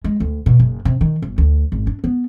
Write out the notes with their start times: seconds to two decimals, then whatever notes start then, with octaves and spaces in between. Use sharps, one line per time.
0.04 G#3
0.20 D2
0.46 B2
0.60 F#1
0.85 C3
1.01 D#3
1.22 G1
1.38 D2
1.72 G#1
1.87 D4
2.04 B3